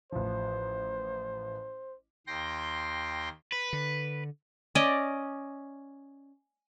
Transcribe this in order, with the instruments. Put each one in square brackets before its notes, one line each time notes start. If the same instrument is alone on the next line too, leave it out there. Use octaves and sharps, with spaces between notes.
[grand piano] A1 F3 [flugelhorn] C5
[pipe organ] D#2 G5 C6 A#6
[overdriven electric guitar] B4
[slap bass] D3
[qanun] C#4 D5 D#5